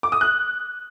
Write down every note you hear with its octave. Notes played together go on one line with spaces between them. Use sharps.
D6
D#6
F#6